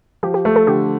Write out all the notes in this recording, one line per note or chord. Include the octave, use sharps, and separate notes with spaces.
F3 G4
G4
A3 A4
A4
D3 G4